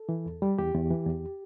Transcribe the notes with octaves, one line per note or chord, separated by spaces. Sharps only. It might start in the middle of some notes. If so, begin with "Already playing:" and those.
Already playing: A4
E3
E2
G3
E2 G4
E2
E3
E2